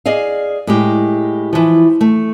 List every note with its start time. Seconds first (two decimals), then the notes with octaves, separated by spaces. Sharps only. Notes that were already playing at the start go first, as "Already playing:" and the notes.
0.06 G#4 D5 D#5 F5
0.67 A2 G#3 G4
1.53 E3 F3
2.01 A3